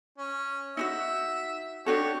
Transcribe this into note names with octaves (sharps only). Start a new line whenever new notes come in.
C#4
D#4 E4 F#4 E5
D4 F#4 G4 A4 C#5